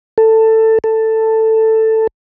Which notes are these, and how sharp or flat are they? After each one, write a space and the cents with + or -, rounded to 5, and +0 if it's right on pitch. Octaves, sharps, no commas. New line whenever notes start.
A4 +15
A4 +10